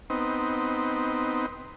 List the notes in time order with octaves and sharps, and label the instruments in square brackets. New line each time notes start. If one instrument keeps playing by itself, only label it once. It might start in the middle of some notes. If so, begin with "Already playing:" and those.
[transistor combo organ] B3 C4 D#4